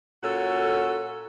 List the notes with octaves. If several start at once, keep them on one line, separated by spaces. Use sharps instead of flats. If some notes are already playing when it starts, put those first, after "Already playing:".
A#2 C#4 F#4 A4